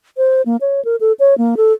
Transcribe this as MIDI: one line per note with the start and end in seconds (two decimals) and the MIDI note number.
0.17 0.42 72
0.46 0.57 58
0.61 0.83 73
0.85 0.96 70
1.00 1.12 69
1.20 1.37 73
1.38 1.55 58
1.57 1.73 69